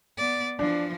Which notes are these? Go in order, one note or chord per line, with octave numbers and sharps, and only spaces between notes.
B3 D5
E3 F3 D4